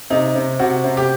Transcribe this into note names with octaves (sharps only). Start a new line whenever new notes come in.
C3 D#4
C3
C3 F#4
C3
G4